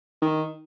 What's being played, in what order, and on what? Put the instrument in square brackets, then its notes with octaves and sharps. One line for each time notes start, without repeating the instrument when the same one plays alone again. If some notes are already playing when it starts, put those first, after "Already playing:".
[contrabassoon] D#3